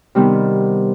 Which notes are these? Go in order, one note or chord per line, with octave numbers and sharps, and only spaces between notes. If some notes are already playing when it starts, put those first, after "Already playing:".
C3 D#3 G3 B3